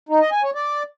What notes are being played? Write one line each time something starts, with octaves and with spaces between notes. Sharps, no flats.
D#4
D#5
G#5
C#5
D5